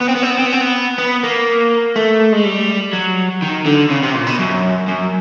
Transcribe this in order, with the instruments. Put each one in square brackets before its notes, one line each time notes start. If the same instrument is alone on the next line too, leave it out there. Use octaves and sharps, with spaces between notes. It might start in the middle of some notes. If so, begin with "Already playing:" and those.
[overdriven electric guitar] B3
C4
B3
C4
B3
C4
B3
C4
B3
B3
A#3
A3
G#3
G3
F#3
D#3
D3
C#3
C3
A#2
B2
F#2
F#2